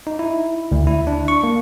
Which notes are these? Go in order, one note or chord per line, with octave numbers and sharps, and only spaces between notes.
D#4
E4
D2
E4
D4
C#6
A#3